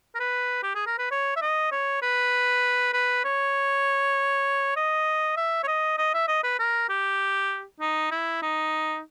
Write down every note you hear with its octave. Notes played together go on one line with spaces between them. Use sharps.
A#4
B4
G4
G#4
A#4
B4
C#5
E5
D#5
C#5
B4
B4
C#5
D#5
E5
C#5
D#5
D#5
E5
D#5
B4
A#4
G4
D#4
E4
D#4